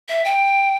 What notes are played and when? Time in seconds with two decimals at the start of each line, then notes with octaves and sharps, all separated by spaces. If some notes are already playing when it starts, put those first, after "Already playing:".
0.09 E5
0.25 G5